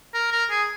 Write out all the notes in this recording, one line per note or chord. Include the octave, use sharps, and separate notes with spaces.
A#4
A#4
G#4